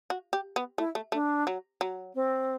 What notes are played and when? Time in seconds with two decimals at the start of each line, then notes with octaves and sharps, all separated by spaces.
0.10 F#4
0.33 G4
0.56 B3
0.78 A3 E4
0.95 A3
1.12 A3 D4
1.47 F#3
1.81 F#3
2.15 C4